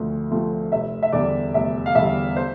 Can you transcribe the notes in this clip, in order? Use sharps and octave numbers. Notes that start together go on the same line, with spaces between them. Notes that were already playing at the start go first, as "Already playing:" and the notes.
Already playing: D2 F3 A3 C4
C3 F3 A3 C4
F1 E5
E5
E2 D3 G3 D5
F1 E5
F5
E2 D3 G3 E5
C5